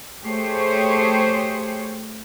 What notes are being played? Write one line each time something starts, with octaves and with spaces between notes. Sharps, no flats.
A3 G4 G#4 C5 C#5